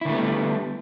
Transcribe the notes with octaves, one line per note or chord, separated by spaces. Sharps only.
D3 G3 A3 B3 E4